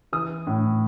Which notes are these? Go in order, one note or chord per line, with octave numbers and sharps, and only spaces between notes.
E3 D#6
A2